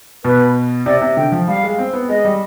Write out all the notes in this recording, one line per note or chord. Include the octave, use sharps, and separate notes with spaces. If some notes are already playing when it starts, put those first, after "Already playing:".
B2 B4
C3 D5
C3
D3 G5
F3
G3 F5
G#3
C4
B3
G#3 D#5
G3